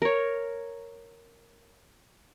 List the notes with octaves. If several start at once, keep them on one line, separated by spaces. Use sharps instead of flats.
A#4 C#5